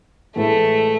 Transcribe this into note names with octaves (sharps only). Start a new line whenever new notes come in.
A2 E3 G#3 A3